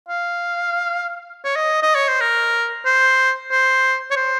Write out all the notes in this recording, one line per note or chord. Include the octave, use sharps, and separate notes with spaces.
F5
C#5
D#5
D#5
C#5
C5
A#4
C5
C5
C#5
C5